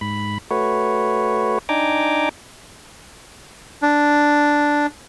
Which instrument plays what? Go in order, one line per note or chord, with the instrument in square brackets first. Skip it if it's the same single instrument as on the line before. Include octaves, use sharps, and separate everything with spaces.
[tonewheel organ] G#2 B5
A3 F#4 B4 C#5
D4 D#4 G5 G#5 A#5 D6
[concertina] D4